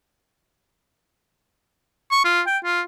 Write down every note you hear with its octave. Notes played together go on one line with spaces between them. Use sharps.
C#6
F4
G5
F4